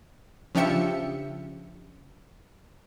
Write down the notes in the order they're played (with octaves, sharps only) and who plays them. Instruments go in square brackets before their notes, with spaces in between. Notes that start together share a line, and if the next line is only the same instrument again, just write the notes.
[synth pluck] C#3 F3 D4 G4 E5 C#7